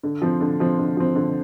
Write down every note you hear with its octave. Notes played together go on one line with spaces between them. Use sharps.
D3
F3 C4
D3
F3 C4
D3
F3 C4
D3